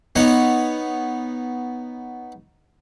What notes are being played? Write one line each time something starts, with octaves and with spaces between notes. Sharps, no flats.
B3 D#4 C#5